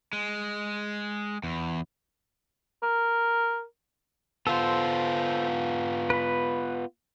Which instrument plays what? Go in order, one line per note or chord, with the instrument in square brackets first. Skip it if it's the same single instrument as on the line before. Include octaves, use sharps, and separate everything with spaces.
[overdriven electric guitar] G#3
E2
[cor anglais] A#4
[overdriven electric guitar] B3 F4 [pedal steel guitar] A4 C5
[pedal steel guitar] B4 B5